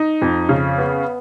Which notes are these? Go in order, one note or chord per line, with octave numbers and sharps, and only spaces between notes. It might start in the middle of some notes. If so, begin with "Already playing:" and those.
Already playing: D#4
F2
C#3
B3